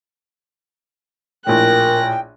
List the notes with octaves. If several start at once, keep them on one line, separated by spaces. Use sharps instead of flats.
A#1 A2 A#4 G5 F#6 A#6